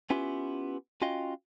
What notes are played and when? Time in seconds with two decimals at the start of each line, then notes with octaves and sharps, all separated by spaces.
0.10 B3 C#4 E4 F4 G4 B4
1.02 C#4 F4 F#4 D#5 F5 G5